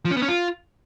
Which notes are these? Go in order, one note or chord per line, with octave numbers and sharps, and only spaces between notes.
F3
C#4
B3
C#4
F4